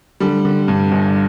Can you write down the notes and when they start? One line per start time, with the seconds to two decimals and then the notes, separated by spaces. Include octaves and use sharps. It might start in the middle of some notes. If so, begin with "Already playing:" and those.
0.20 D3 G3
0.45 D3
0.68 G2
0.91 G1